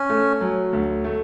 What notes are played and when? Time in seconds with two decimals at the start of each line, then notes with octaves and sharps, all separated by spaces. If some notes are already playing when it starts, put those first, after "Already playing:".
Already playing: C#4
0.10 A3
0.41 F#3
0.73 D2
1.04 A3